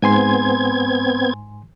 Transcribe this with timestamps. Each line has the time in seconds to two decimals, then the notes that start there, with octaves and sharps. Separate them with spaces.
0.02 G#2 B3 C4 G#5 C6 G#6